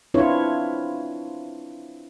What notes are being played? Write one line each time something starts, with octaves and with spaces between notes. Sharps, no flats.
C4 D4 E4 F4 B4 C#5